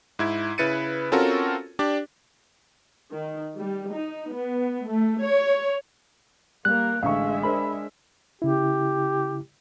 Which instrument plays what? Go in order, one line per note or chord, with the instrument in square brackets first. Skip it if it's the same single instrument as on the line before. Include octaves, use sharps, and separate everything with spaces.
[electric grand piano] G#2 E4 G#6
C#3 E4 B4 A6 C#7 D#7
C4 C#4 F4 F#4 A4 A#4
D4 G4 D5 D6
[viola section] D#3
G3
D#4
B3
A3
C#5
[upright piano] G3 [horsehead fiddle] A#3 A#4 [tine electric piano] F#6
[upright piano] A1 D3 C#6 [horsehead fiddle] G#3 E5 [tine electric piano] F5
[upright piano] D4 A#4 C5 [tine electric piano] B5
[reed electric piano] C#3 E4 [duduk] G4